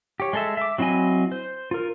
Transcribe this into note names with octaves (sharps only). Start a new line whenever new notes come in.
G4 C#5
G#3 A4 E5
E5 D6
F#3 C4 E4 D#5 G#5
C5
F4 A#4